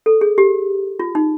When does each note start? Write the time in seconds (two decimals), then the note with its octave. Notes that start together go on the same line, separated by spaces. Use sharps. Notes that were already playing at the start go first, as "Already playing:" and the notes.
0.06 A4
0.21 G#4
0.38 G4
0.99 F4
1.15 D#4